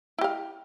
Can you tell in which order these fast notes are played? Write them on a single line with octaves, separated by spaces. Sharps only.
E4 G4 F5